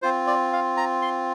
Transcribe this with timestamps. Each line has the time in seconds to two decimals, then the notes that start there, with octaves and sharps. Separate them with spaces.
0.02 C4 F4 C5
0.27 D5
0.53 F5
0.77 A#5
1.02 C6